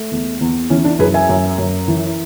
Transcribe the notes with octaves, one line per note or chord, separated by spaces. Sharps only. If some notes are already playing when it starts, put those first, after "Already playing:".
Already playing: A3
E2
E2
E3 C#4
D4
F#2 G#4 B4
E5 G#5
F#2
F#2
E3